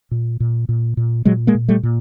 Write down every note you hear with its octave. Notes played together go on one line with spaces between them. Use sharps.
A#2
A#2
A#2
A#2
A#2 F#3 G#3
G#3 A#3
A#2
G3 A3
A#2